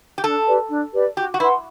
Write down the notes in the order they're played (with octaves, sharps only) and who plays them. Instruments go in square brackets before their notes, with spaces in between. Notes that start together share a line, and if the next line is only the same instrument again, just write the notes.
[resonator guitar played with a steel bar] G4
[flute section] D4 [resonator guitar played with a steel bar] A4
[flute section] G4 B4 D5
D4
G4 B4 D5
[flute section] F#4 [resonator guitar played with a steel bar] G4
[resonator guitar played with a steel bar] F#4
[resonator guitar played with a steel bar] E4 [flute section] B4 F#5 C6